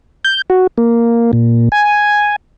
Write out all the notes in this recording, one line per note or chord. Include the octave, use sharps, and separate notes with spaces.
G6
F#4
A#3
A#2
G#5